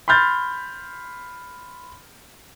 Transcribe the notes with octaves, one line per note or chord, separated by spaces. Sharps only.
B5 C6 F6 G6 A6